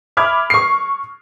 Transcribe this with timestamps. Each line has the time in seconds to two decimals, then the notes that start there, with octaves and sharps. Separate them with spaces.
0.17 E5 B5 D6 F6 G#6
0.50 C#6 C7